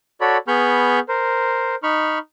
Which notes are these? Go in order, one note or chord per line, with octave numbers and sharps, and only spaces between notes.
F#4 A4 C#5 D5 B5
B3 G#4 B5 C#6 F6 G6
A#4 C5
D#4 B5 C#6 F6